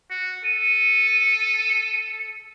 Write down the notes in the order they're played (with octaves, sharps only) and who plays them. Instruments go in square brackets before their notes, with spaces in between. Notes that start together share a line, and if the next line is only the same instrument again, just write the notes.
[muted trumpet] F#4
[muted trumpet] A4 [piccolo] D#7